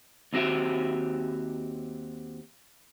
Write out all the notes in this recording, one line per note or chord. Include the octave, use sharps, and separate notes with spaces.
D#2 C4 F#4 G4 E5